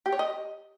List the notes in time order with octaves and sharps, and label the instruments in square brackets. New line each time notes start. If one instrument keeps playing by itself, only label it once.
[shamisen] G4
C#5
D#5